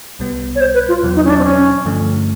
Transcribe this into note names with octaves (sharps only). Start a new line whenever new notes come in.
C2 B2 G3 B3
C#5
C5
B4
F4
E2 B2 F#3
D#4
C#4
D4
C4
C#4
G2 D3 F3 A3